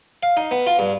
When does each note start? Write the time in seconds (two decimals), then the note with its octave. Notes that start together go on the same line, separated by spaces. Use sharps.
0.23 F5
0.37 D#4
0.51 B3
0.67 F4
0.79 G2